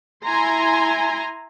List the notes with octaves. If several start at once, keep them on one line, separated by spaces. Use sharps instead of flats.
E4 G#5 A#5 C6